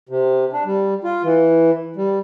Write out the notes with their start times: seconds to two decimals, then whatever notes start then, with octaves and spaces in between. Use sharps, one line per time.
0.09 C3
0.53 D4
0.65 G3
1.04 F4
1.24 E3
1.96 G3